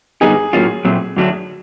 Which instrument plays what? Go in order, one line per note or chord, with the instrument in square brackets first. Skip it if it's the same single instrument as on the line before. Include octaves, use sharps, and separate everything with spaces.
[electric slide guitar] D3 G3 B3 D#4 [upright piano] G#4
[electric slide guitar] A2 F#3 A#3 C#4 F4
A#2 F#3 A3 C4
F#2 D3 F#3 A3 D4